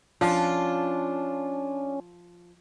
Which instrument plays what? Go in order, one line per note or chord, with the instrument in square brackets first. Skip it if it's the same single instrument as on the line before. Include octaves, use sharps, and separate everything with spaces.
[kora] F3 [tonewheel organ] C#4 [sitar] D4 F4